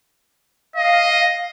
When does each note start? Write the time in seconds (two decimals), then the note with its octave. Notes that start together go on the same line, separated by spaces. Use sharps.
0.76 D#5 F5